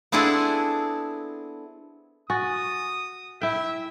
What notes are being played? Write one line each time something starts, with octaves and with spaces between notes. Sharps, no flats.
B3 C4 D4 E4 G#4 A4
F#4 G#5 D#6 A6
E4 E5 G5